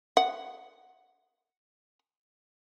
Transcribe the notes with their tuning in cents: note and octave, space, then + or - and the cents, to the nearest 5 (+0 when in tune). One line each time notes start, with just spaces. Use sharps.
F#5 +0